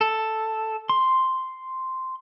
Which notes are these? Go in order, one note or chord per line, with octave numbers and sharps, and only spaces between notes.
A4
C6